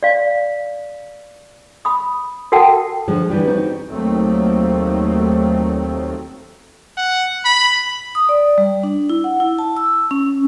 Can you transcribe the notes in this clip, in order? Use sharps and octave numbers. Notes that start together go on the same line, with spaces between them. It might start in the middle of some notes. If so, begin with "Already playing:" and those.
D5 F5
B5 D#6
F#4 A4 A#4 F#5 G5 A5
D3 F3 G#3
D3 E3 G3 G4
C4 D#4 F#4
D#2 D#3 F#3 A3 A#3 C4
F#5
B5
D#6
D5
G3
D4
E4
F#5
E4
A5
E6
C#4